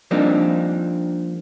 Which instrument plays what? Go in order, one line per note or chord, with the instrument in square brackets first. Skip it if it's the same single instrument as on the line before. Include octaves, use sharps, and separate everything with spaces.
[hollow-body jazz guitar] F3 G3 A#3 C4 D4 D#4